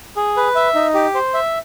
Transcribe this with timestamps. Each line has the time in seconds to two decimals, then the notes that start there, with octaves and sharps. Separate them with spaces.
0.16 G#4
0.37 B4
0.55 E5
0.75 D#4
0.94 G4
1.15 C5
1.34 E5